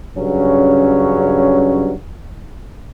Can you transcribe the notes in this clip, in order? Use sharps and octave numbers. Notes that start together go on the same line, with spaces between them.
G2 C#3 F#3 C#4